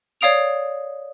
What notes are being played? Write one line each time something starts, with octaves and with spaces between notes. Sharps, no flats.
C#5 D5 F5 D#6 D7 F7